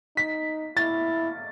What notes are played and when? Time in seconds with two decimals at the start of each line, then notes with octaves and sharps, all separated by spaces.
0.17 D#4 B6
0.77 E4 A6